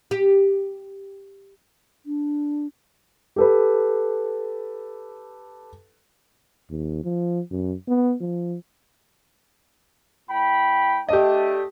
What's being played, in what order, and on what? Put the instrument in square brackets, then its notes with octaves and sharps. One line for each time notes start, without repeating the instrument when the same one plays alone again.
[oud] G4
[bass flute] D4
[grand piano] G4 A4 B4
[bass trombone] D#2
F3
F#2
B3
F3
[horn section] A2 G5 B5
[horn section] A3 D4 [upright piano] G4 D#5